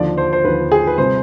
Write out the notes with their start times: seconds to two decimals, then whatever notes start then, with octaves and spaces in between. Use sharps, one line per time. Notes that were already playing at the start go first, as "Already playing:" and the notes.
Already playing: D#2 D3 F3 D5
0.18 C5
0.33 C5
0.44 D#2 D3 F3 B4
0.72 G#4
0.87 B4
0.98 C3 G3 C5